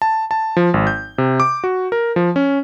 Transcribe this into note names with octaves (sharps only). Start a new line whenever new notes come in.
A5
A5
F3
G#1
G6
C3
D6
F#4
A#4
F3
C#4